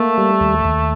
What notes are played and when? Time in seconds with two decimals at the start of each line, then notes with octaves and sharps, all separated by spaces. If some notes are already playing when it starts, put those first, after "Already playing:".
Already playing: A3 A#3
0.18 G3
0.41 D#2
0.65 D#2